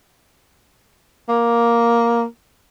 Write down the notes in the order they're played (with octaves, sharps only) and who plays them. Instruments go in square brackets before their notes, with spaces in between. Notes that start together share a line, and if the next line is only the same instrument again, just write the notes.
[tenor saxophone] A#3